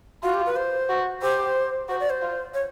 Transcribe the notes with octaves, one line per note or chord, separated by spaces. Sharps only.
F4 F#4
G4
B4
C5
F#4
G4 C5
F#4 C5
D5
C5
F4
C#5